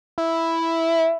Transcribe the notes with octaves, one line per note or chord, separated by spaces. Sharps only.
E4